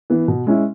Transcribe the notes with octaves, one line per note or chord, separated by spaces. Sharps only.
E3 B3
B2
G#3 C#4 E4